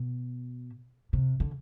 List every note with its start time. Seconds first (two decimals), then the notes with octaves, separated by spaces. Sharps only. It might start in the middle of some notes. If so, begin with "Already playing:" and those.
Already playing: B2
1.13 C3
1.40 D3